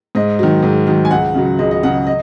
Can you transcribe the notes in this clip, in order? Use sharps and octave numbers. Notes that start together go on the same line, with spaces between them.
G#2 D#5
D#3 F#3
G#2
D#3 F#3
G#5
C#2 F#5
C#3 F#3
C#2 D#5
D#5
C#3 F#3 F#5
D#5